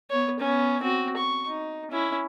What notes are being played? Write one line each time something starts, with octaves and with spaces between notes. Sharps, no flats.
B3 C#5
B3 C#4
C4 F#4
C#6
D#4
C#4 E4